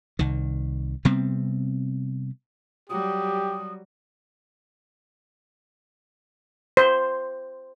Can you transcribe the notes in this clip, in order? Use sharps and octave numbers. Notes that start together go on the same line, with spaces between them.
C2 D#3
C3 G3 B3 C4
F#3 G3 G4 D#6
C5